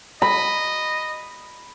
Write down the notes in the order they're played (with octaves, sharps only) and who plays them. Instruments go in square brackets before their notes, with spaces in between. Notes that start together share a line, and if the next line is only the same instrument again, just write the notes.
[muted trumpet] D#5 [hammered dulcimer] B5